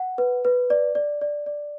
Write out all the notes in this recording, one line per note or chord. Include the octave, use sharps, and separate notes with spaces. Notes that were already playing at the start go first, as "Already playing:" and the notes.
Already playing: F#5
B4
B4
D5
D5
D5
D5